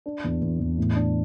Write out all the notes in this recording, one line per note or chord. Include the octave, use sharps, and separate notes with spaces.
D4
E2
E2
E2
A2
D4